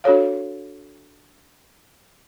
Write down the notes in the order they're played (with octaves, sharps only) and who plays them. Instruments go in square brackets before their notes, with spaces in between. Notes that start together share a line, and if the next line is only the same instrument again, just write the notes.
[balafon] D4 F#4 A4 C#5 F5